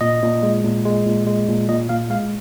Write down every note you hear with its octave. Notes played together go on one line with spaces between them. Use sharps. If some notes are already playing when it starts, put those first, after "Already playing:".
A#2 D#5
A#2
G#3
A#2
G#3
A#2
G#3
A#2
A#2 D#5
A#2 F5
G#3 F5